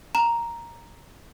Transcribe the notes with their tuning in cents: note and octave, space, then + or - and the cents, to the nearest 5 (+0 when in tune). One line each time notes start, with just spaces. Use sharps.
A#5 +0